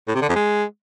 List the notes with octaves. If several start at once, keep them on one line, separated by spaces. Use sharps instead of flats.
A2
C3
D3
F2
G#3